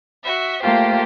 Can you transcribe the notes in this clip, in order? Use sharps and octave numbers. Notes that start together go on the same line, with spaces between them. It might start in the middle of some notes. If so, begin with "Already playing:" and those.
F#4 E5
A3 A#3 F4 G4 C5